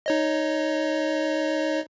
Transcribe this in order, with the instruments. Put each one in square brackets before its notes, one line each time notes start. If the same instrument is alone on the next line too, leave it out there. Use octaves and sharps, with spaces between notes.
[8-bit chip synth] D#4 C#5 D#5